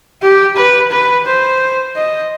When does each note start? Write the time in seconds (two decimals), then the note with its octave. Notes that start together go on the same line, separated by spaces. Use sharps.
0.22 G4
0.57 B4
0.92 B4
1.26 C5
1.96 D#5